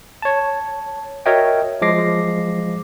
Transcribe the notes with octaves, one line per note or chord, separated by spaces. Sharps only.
C#5 A5
F#4 A#4 C#5 D#5 E5 G5
F3 G#3 D6 A#6 C7